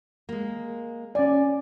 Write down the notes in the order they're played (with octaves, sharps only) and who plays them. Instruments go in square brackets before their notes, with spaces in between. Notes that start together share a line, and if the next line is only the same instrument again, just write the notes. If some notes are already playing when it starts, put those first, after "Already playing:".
[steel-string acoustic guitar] G#3 A#3
[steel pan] C#4 D5 [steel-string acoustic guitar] G#5